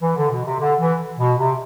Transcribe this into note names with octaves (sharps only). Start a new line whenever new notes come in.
E3
D3
B2
C3
D3
E3
B2
C3